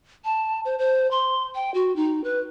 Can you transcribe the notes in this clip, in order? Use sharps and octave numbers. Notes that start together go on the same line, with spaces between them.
A5
C5
C5
C6
G5
F#4
D#4
B4